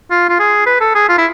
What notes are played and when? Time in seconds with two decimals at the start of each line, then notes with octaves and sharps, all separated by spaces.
0.11 F4
0.29 F4
0.39 G#4
0.67 B4
0.81 A4
0.95 G#4
1.09 F4
1.18 E4